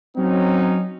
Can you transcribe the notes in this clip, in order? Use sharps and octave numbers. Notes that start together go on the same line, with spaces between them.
F#3 C4 C#4 D#4